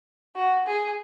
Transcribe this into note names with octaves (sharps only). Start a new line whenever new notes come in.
F#4
G#4